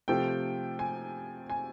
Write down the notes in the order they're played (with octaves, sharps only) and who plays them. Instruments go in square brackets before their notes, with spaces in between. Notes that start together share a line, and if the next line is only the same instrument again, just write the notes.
[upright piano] C3 F3 A3 G5
G#5
G#5